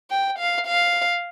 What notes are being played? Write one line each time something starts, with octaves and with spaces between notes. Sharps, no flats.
G5
F5
F5